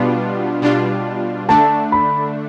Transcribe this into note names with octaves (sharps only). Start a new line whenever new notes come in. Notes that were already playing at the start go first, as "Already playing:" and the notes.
Already playing: B2 G3 B3 D4 F4
B2 G3 D4 F4
D3 A3 D4 A5
B5